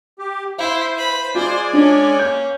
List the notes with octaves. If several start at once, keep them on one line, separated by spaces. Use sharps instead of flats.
G4
E4 C5 F5 C6
B4 B5
G#3 F4 C5 D5 G#5
C#4 D4
A#3 G6